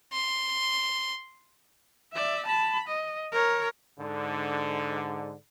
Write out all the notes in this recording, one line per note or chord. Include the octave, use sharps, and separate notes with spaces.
C6
D5 E5
A5 B5
D#5
A#4 C#5
G#2 D3